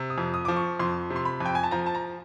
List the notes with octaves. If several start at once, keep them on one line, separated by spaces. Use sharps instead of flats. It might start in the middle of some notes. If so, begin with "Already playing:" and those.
Already playing: C3
D#6
F2
D#6
F3 D6
C#6
F2 C6
C3
C6
B5
F2 G5
G#5
A5
F3 A#5
A5
A#5